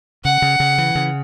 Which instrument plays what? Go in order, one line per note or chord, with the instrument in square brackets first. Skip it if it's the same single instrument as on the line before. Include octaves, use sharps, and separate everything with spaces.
[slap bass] C#3 [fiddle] F#5
[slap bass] C#3
C#3
E3
C#3